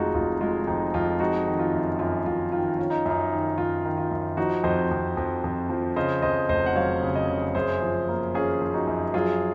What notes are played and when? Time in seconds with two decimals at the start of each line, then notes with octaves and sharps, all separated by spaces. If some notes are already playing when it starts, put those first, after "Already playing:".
Already playing: F1 G#3 D#4 F4 F#4 G#4
0.14 F1 F4
0.41 G#3 F4
0.67 F2 D#4
0.94 F2 F4
1.20 G#3 D#4 F#4
1.46 D#3
1.59 F4
1.73 F#2
1.99 F#2 F4
2.26 F#2 F4
2.52 D#3 F4
2.78 C#4 F4
2.90 D#4
3.06 F#2 D#4
3.32 D#3
3.58 F#2 F4
3.85 D#3
3.98 F4
4.11 F#2
4.37 F3 D#4 F#4
4.64 F2 C5 D#5
4.91 F2
5.17 F2
5.44 F2
5.70 F3
5.96 C#3 C5 D#5
6.22 F2 C5 D#5
6.49 F1 C5 D#5
6.66 F#5
6.75 F#3 C#5 F5
7.03 C#3
7.15 C5 D#5
7.28 C#3
7.55 F#2 G#4 C5
7.82 F3
8.08 A#3
8.35 C#4 F4 G#4
8.61 F3
8.74 D#4 F#4
8.87 F#2
9.14 F#3 F4 G#4